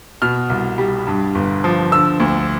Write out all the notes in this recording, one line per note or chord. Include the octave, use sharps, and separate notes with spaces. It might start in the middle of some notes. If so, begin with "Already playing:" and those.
B2 F6
C2
G3
G2
G1
F3
D3 E6
D2